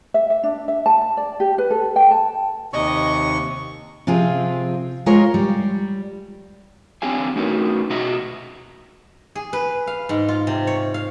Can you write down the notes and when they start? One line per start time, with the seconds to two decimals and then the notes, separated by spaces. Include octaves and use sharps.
0.14 E5
0.30 E5
0.43 D4
0.68 E5
0.86 A5
1.02 A5
1.17 D5
1.40 G4
1.58 B4
1.71 A4
1.96 G5
2.11 A5
2.73 D#2 C3 D#5 C#6
4.07 C3 F3 C4 F4 G#4
5.06 G#3 F4 A#4 C#5
5.34 G3
7.02 C4 D4 G4 F5 G#5
7.36 A3 C#4 D#4 F#4 A#4 B4
7.90 B2 F#4 D#5 E5 A#5
9.35 G#4
9.53 B4
9.87 F5
10.09 G#2
10.29 F4
10.47 C3
10.67 C#5
10.94 F5